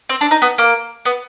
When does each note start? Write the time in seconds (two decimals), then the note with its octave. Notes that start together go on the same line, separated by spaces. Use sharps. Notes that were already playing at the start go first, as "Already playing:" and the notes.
0.09 C4
0.21 D4
0.31 D#4
0.42 B3
0.58 A#3
1.05 B3